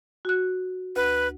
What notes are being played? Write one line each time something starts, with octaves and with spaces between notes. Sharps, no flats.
F#4 F#6
D2 B4